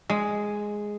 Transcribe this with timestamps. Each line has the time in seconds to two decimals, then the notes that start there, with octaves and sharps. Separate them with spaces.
0.10 G#3